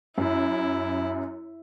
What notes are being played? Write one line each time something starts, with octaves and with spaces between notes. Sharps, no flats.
F#2 E4